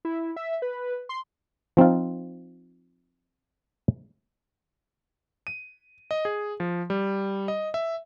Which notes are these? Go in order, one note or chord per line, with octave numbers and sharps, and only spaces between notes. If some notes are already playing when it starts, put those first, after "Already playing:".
E4
E5
B4
C6
F3 C4 D#4 F4
D#7
D#5
G#4
F3
G3
D#5
E5